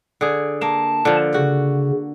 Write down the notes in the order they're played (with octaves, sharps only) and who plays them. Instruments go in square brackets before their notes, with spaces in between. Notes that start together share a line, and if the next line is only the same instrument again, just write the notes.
[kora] D3 G#4
[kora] A#3 [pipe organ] A5
[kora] D3 F3
[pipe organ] C#3 [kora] F#4